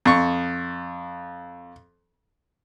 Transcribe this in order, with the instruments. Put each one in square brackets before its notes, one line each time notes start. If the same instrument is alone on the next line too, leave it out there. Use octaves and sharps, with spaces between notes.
[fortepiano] F2 C#6